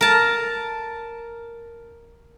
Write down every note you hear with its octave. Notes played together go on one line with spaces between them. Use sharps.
A#4 A5